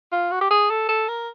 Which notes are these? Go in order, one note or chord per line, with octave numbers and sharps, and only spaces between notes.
F4
F#4
G4
G#4
A4
A4
A#4